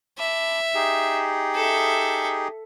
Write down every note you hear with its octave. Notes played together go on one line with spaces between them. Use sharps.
E5 A5 B5 D6
D#4 G4 G#4
A4 E5